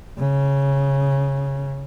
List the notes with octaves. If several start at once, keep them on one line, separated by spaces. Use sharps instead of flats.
C#3